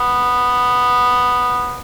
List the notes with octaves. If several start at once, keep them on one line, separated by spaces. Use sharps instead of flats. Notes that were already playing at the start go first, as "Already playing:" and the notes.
Already playing: B3